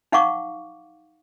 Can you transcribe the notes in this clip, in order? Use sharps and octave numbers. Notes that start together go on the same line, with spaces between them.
D#4 F5 F#5 C#6 D6